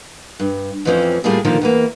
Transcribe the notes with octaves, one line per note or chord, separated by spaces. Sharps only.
G2
F2 A2 E3 F3 C4 C#4
A2 G3 A#3 D4 F4 G#4
A#2 D3 D#3 F3 A#3 A#4
E2 E3 A#3